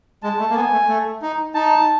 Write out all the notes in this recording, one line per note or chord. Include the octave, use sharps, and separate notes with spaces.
G#3 A5
A3
A#3
B3 G#5
A3
A3
D#4
D#4 A5